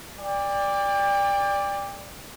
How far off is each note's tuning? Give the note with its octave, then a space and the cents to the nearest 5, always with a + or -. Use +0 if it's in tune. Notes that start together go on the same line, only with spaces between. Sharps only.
D5 +0 G5 +35